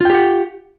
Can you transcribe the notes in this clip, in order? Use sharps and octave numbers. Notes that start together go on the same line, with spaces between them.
F4 G4 F#5 G5